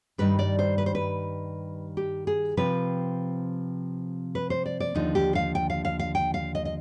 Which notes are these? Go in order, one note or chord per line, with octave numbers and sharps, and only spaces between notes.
G2 D#3 G3 B4
D5
C5
B4
C5
B4
G4
G#4
C3 F3 C4 B4
B4
C5
D5
D5
D#2 D3 F3 D#4
G4
F5
G5
F5
F5
F5
G5
F5
D#5
D#5